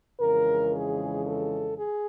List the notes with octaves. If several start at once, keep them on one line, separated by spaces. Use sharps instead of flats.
F2 C#3 E3 G#3 A#4
G#4
A4
G#4